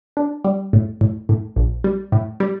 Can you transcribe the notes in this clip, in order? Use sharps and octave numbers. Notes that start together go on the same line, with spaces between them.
D4
G3
A2
A2
A2
A#1
G3
A2
G3